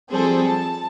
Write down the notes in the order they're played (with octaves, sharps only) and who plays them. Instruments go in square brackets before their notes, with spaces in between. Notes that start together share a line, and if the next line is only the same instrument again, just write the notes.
[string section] F3 G3 C4 G#4 A4 C5
A5